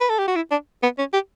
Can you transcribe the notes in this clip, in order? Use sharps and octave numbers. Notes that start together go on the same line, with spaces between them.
B4
A4
G4
F#4
E4
D4
B3
C#4
G4